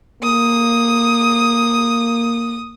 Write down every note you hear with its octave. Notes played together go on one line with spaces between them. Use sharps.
A#3 D#6